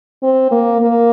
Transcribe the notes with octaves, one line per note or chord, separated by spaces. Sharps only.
C4
A#3
A#3